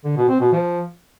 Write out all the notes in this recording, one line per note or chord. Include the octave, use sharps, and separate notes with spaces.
D3
B2
C4
B2
F3